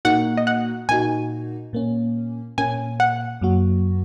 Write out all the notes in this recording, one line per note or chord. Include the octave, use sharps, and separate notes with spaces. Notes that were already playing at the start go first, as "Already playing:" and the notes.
A#2 A#3 D#4 F#4 F#5
D#5
F#5
A#2 A#3 D#4 F#4 G#5
A#2 A#3 C#4
A#2 A#3 C#4 G#5
F#5
F#2 F#3 A#3 F#4